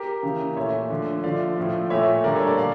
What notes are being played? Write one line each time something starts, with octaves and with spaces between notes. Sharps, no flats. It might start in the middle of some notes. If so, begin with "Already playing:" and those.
Already playing: G4 A#4
C#3 E3 A#3
A#2 A3 C#5 E5
D3 F3 A3
D3 F3 A3 D5 F5
A2 F3 A3
A#2 A3 C#5 E5
D3 G3 A#3 A#4 D5
A4 C#5
A#4 D5
A#2 D5 F5